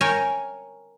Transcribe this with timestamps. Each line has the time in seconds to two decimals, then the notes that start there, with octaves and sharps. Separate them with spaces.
0.01 A#4 C#5 G5 G#5